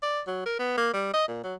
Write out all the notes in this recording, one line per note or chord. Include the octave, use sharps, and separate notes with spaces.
D5
F#3
A#4
B3
A#3
G3
D#5
A#2
F#3